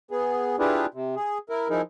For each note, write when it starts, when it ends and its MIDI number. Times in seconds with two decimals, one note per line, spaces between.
0.11 0.56 59
0.11 0.56 68
0.59 0.86 62
0.59 0.86 64
0.59 0.86 65
0.59 0.86 67
0.59 0.86 68
0.59 0.86 71
0.94 1.15 48
1.16 1.38 68
1.50 1.69 64
1.50 1.69 70
1.70 1.81 53
1.70 1.81 63
1.70 1.81 64
1.70 1.81 68
1.70 1.81 70